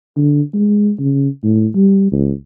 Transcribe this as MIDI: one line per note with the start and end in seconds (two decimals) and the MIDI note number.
0.17 0.42 50
0.54 0.92 56
1.00 1.28 49
1.44 1.67 45
1.75 2.10 55
2.12 2.32 37